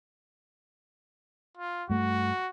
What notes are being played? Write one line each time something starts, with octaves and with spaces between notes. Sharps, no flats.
F4
G2 A3 F#4